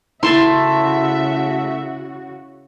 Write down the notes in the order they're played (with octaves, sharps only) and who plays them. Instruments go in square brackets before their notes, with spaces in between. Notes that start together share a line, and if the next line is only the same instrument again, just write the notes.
[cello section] C#3 F#4 [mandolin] A3 A5 C6 [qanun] E4 [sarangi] E5